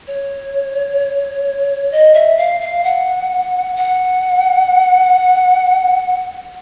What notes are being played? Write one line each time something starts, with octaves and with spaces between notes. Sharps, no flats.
C#5
D#5
E5
F5
F5
F#5
F#5